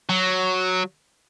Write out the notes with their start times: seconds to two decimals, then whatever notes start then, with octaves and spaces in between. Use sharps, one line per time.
0.09 F#3